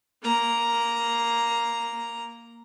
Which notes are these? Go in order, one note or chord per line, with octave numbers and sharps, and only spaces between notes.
A#3 A#5